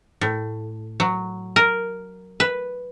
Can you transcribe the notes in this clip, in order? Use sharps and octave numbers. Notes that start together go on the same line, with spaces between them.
A2
F#3
A#4
B4